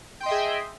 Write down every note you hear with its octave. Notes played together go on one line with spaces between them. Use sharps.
G#4 D#5 E5 G5 C6